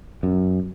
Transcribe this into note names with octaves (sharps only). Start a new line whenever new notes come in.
F#2